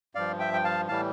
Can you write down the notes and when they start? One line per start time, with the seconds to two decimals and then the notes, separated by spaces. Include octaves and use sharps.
0.15 G2 F3 D5 F5
0.39 E5 G5
0.53 G5
0.64 F5 A5
0.88 A2 E3 G3 F5 A5